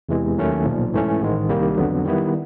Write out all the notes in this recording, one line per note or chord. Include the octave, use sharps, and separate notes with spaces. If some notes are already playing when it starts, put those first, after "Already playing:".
E2 C3 E3 G#3
D#2 D#3 F#3 A3 C#4
B1 A#2 F3
G#2 E3 A3 C#4
A1 G#2 D#3 G#3
C2 C3 D#3 G3 A#3
F2 D3 F#3 B3
D#3 G3 B3 E4